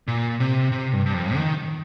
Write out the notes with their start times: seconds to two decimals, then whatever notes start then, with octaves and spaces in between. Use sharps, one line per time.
0.08 A#2
0.40 C3
0.72 C3
0.93 G2
1.06 G2
1.14 F2
1.35 D#3